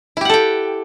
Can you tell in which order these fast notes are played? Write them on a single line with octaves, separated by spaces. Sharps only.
E4 G4 F#5 A4 G5